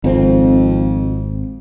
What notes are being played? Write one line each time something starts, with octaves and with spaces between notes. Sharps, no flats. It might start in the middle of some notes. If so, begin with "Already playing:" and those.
G#1 F2 C4